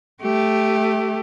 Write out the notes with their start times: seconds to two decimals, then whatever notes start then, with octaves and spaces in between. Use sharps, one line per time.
0.22 A3 G4